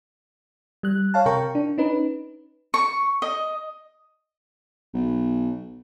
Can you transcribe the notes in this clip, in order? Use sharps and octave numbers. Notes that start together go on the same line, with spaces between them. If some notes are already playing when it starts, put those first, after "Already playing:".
G3 F#6
C#5 F5 A5
C3 A#4 G5 A#5 C#6
D4
C#4 D#4 B4
C#6
D#5
B1